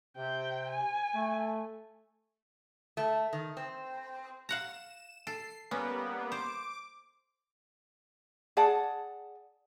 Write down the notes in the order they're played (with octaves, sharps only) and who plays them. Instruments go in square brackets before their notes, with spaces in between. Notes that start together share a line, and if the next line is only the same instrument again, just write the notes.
[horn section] C3 [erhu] G5
[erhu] G#5
[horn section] A3
[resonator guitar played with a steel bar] A3
D#3
C4
[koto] F5 F#5 A#5 [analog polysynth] E7
[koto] A4 [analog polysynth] C7
[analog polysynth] G3 A#3 B3 [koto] C#4
[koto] C5 [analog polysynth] D6
[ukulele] G#4 D5 F#5 A5